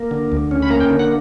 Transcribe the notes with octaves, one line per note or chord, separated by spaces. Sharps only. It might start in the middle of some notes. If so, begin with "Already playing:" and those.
Already playing: A#3
D3
D2
C#4
B5
A#3 A#5
G5
D3
F#5